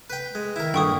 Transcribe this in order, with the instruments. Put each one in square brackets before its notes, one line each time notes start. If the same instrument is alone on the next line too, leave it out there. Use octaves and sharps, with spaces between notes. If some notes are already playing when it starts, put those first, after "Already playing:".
[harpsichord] B4 G5
G#3
[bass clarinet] D#3 [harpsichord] E4 A#4
[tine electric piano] G2 D3 [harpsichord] A#2 [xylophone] G5 C#6 D#6